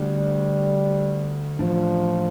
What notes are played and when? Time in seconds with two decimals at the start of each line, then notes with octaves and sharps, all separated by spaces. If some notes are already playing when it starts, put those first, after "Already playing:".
Already playing: D3 G3 A3 D4
1.59 A2 E3 F3 A3 D4